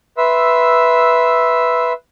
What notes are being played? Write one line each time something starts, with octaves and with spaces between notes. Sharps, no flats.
B4 E5 C6 E6